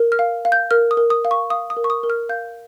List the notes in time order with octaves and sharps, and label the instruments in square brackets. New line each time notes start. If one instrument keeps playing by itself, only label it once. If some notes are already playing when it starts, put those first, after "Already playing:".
Already playing: [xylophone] A#4
F6
F5
F5
G6
A#4 F6
D#6
A#4
D#6
F5
C#6
F5 D#6
D#6
A#4
C#6
D#6
A#4
F6
F5 G6